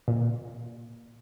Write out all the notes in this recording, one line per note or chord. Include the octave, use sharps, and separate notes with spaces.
A#2